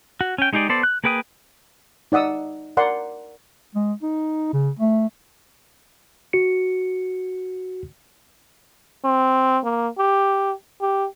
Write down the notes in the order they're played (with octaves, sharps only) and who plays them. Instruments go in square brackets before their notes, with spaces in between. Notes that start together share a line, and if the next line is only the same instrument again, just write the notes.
[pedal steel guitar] F#4
C#4 G5
G#3 D#4 G4 G#4 D5
B3 A4 C5 D5
F#6
A#3 G#4 B4 G5 D#6
[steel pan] D#4 D5 F#5 D#6 E6
A#4 D5 F#5 C6
[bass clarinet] G#3
D#4
C#3
A3
[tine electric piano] F#4 C#7
[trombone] C4
A#3
G4
G4